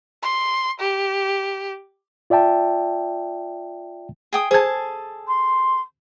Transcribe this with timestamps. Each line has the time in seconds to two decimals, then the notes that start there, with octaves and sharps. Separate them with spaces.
0.23 C6
0.80 G4
2.30 F4 D5 E5 G5 A5
4.33 G#4 G5 D#6
4.51 G#4 A4 C5 A5 G#6
5.27 C6